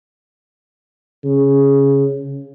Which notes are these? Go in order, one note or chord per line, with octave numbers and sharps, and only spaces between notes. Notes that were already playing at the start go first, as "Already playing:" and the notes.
C#3